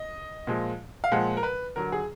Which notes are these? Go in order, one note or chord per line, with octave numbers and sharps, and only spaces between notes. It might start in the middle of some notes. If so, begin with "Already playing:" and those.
Already playing: D#5
A#2 F3 G#3
F5
A#2 F3 G#3 F#5
A#4
B4
D3 F#3 A#4
G#4